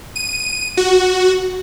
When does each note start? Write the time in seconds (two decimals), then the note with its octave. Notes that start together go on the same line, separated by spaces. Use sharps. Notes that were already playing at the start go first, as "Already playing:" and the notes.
0.16 D#7
0.77 F#4